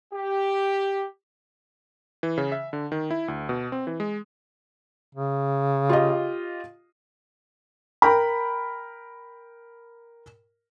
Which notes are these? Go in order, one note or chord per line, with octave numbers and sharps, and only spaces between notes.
G4
E3
C#3
E5
D3
D#3
E4
D2
B2
C4
E3
G#3
C#3
F4 G4 D#5
A#4 G5 A#5 B5